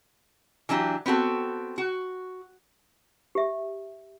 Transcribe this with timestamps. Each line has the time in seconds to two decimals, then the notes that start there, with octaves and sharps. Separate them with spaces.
0.69 E3 F#3 D4 G4
1.06 B3 C4 F#4 A4
1.78 F#4
3.35 G4 E5